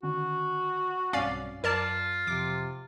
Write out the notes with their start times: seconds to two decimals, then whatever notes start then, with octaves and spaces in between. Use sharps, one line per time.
0.03 D3 D#3 C#4 F#4
1.13 B1 G2 C4 C#4 D5 F5
1.64 F#2 F4 A#4 D5 A5
2.27 F2 C3 D6